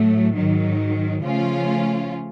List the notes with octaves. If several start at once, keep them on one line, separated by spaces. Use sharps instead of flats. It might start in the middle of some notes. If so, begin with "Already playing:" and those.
Already playing: A2 F#3 A3
G#2 D#3 F#3
C#3 F3 A3 C#4 F4